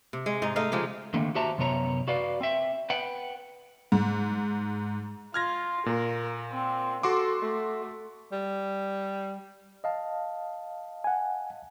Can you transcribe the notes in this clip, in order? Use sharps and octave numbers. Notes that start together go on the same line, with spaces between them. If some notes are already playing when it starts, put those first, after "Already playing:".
C3
G#3
G#2 D#4
A3 D#4 D#5 F5
C#3 F3 G#3 G4
D3 D#3 A3 A#3 C4
F#4 G4 C5 E5 A5 A#5
F#2 C3 B3 C#5 A#5
F#4 B4 D5 F5
C4 E5
B4 F#5 G5
G#2
F4 F6 G#6 A#6
A#2 A#4
C4
F#4 A4 C6 D6
A3
G3
D#5 F5 A5
F#5 G#5